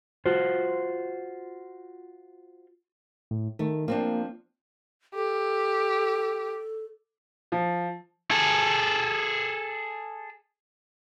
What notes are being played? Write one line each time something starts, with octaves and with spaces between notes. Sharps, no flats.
F4 F#4 C5
A2
D#3 A3
F3 A#3 C4 D4
G4 A4
F3
G#4 A4